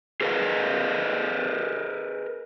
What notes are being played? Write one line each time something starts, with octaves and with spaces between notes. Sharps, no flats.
G#4 A#4 B4 D5 D#5 F5